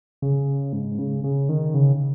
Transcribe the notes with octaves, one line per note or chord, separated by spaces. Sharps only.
C#3
G#2
C#3
C#3
D#3
C#3